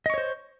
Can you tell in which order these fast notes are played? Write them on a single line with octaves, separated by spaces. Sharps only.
D#5 C#6 C#5 C5